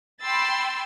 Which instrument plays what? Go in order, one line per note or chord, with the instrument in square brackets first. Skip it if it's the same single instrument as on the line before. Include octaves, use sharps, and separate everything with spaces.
[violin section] G5 B5 C6 E6 A6